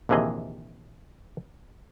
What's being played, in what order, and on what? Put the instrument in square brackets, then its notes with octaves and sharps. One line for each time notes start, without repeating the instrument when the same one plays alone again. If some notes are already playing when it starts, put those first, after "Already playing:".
[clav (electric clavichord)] A#1 D#2 C3 E3 G#4 D#5